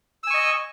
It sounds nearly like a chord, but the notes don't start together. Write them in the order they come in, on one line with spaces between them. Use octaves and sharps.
E6 G#5 C#6 D#5